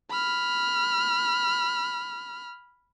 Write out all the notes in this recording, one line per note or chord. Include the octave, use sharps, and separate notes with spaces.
B5 F6